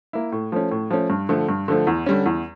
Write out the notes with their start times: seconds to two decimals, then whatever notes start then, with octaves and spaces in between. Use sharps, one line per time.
0.13 A#3 E4
0.32 A2
0.52 F3 A3 C#4
0.71 A2
0.91 F3 A3 C#4
1.10 G2
1.29 D3 F3 A3
1.49 G2
1.68 D3 F3 A3
1.87 E2
2.06 D3 G3 C#4
2.26 E2